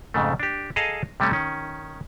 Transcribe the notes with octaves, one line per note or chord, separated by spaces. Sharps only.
F2 G#2 C#3 A3
D4 G4
G#4 A4 D#5 F5 A5 A#5
C3 G3 A3 C#4
D#3 C#4